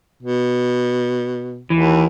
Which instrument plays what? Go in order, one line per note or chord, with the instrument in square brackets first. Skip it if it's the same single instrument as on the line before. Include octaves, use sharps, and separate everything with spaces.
[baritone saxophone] B2
[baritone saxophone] D#2 [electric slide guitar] E3